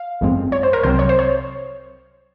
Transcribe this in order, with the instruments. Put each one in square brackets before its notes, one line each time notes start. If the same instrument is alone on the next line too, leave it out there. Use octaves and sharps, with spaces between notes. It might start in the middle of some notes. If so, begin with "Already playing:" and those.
Already playing: [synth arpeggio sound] F5
G#1 F#2 F3 G#3 C4
C#5
C5
A#4
C2 C3 F#3 C4 C5
C#5
C5
C#5